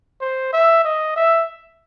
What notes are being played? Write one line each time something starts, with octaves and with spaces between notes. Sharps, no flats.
C5
E5
D#5
E5